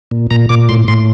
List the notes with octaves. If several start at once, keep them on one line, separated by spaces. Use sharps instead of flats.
A#2
A#2 A#5
A#2 D6
A2 C6
A2 C6